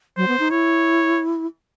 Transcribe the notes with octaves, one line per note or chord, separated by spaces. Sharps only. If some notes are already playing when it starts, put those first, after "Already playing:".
F#3 C5
B3
D#4
E4 C#5